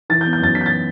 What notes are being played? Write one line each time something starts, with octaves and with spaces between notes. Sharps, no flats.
E3 A6
G6
B3
G6
F#2 A6
E3 B6
G6
A6